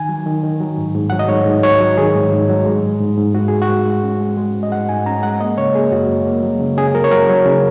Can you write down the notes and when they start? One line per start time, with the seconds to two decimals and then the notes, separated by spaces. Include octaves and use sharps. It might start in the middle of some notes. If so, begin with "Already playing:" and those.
Already playing: D#3 G#5
0.09 F#3
0.26 D#3
0.43 D#3
0.60 F#3
0.77 G#2
0.95 G#2
1.10 F#3 F#5
1.19 D#5
1.29 G#2 C#5
1.46 G#2
1.63 F#3 C#5
1.81 F#3
1.98 D#3 G#4
2.15 G#2
2.32 G#2
2.49 F#3
2.66 G#3
2.83 G#2
3.00 G#2
3.17 G#2
3.34 G#2 F#4
3.48 G#2 G#4
3.62 F#4
3.69 G#2
3.86 G#3
4.03 C#4
4.20 G#3
4.37 G#3
4.55 G#2
4.63 D#5
4.72 G#2 F#5
4.89 G#2 G#5
5.06 C#4 A#5
5.23 G#3 F#5
5.40 A#3 D#5
5.58 C#3 C#5
5.75 A#3 G#4
5.92 F#2 F#4
6.09 F#2
6.26 A#3
6.43 F#3
6.61 C#3
6.77 C#3 G#4
6.95 F#3 A#4
7.04 C#5
7.12 F#3 A#4
7.29 F#3
7.46 C#3